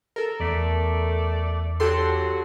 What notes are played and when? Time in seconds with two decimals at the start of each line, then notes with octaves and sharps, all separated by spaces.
0.16 A4 A#4
0.40 E2 A3 D5 B6
1.80 D3 F#3 F#4 G4 A4 C6